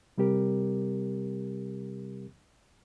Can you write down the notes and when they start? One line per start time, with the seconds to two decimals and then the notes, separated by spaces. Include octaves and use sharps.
0.18 C3 G3 C4 G4 A#4